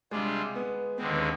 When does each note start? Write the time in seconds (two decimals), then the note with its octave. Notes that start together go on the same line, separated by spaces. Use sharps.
0.11 C3 G3 G#3 D4 F4
0.55 B3
0.98 D#2 D3 G#3 B3 C4
1.12 B3